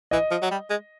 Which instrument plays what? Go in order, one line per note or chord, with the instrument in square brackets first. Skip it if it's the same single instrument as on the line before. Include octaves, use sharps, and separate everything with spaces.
[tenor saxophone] E3 [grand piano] D#5
[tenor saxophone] F3
F#3
G3
G#3